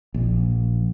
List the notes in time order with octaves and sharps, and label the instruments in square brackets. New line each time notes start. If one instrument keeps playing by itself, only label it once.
[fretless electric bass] A#1